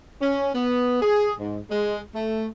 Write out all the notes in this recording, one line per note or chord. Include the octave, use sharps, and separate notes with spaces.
C#4
B3
G#4
G#2
G#3
A3